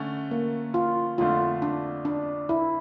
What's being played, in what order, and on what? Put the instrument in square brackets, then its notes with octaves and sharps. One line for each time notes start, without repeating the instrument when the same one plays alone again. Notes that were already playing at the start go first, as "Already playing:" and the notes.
Already playing: [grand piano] D3 A3 C#4
[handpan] A#3
F4
[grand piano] F2 D3 A3 [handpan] F4
[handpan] D4
D4
E4